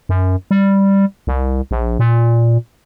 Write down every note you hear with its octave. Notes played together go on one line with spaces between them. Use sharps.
F#2
G3
C2
A#1
A#2